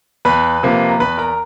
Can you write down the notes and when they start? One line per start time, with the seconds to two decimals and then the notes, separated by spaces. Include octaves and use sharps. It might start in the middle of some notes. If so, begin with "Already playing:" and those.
0.25 E2 B4 B5
0.63 C3 F3 A#3
0.89 A#5
0.99 E2 B4 B5
1.18 A#4 A#5